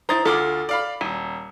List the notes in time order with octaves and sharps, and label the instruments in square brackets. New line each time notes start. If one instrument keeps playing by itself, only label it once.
[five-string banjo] E4 C5 [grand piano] A#5 D#6 A6
[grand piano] D2 F4 D6 [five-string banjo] G#4 A4
[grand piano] D5 F5 B5
[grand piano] D#1 [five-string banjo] G#5